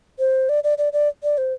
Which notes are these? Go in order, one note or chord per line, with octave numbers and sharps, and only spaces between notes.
C5
D5
D5
D5
D5
D5
C5